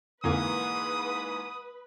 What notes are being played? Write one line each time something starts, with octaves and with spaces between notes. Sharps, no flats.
F2 G#2 D3 E3 A#3 B4 D#6